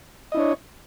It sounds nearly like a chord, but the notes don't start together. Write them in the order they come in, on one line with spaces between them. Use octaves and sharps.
D#5 E4 D4 C#5